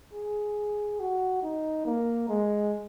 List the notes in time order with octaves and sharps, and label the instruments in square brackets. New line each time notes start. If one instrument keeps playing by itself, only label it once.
[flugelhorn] G#4
F#4
D#4
A#3
G#3